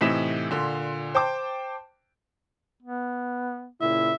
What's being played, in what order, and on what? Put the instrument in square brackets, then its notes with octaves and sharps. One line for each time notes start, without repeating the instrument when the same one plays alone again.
[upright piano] A2 C3 E3 D#4 B6 E7
A#2 D3 C6
C5 G5 A5 D6
[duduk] B3
[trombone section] A#2 C#3 E4 [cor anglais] E5